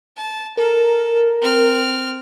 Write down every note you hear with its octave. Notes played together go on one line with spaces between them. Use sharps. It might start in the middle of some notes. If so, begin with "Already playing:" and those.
A5
A4 A#4
C4 F6